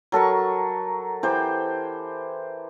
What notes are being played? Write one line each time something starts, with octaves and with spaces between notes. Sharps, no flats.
F#3 A4 A#4 C#6
E3 G4 C5